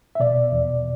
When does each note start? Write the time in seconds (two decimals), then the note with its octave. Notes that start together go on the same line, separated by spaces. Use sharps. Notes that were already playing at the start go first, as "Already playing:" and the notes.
0.15 E5
0.20 B2 D5
0.52 E2